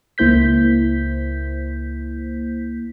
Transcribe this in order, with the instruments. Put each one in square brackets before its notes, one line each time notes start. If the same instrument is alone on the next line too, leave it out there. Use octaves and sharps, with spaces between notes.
[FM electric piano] C#2 A#3 E4 C5 G6 B6